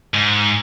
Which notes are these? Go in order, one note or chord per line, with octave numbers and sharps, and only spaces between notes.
G#2